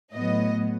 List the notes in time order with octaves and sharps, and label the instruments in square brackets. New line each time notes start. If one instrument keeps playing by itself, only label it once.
[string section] A2 F#3 B3 D#5